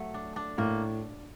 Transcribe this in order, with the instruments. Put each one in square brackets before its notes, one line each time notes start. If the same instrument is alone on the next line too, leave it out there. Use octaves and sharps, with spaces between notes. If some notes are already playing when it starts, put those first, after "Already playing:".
Already playing: [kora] F#3 A3
D4
D4
[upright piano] A2 [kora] A#3